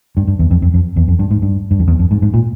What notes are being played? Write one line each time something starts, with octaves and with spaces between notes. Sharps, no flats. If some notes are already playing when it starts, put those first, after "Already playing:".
G2
G2
E2
F2
F2
F2
E2
F2
G2
G#2
G2
G2
F2
E2
F2
G#2
G#2
A#2